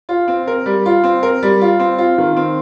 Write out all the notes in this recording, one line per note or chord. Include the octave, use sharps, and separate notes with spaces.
F4
C4
A#4
G3
F4
C4
A#4
G3
F4
C4
F4
D#3
C4